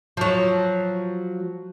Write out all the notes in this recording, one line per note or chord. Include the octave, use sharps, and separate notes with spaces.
F3 F#3